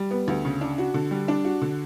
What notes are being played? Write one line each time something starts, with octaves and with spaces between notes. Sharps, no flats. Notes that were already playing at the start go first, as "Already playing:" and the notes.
Already playing: G3
B3
D2
C#3
D4
F#4
D3
G3
D4
F#4
D3